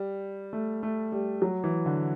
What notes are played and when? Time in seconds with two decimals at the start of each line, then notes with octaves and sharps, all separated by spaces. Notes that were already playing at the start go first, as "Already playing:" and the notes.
Already playing: G3
0.53 A3
0.83 A3
1.12 G3
1.42 F#3
1.64 E3
1.86 D3